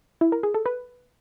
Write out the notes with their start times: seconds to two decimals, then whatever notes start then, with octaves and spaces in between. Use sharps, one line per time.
0.21 E4
0.32 A#4
0.43 G#4
0.54 A4
0.66 B4